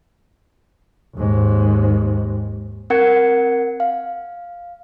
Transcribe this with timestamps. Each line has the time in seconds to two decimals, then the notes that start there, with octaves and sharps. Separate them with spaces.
1.16 D#2 G#2
2.90 C4 A#4 F#5 G#6 C#7
3.80 F5